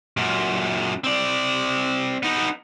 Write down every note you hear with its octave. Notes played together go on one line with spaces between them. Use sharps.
F#2 A#2
C4 D5
B3 D#4